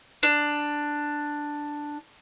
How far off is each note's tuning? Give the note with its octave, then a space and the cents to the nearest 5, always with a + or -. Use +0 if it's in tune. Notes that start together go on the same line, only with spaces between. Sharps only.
D4 +5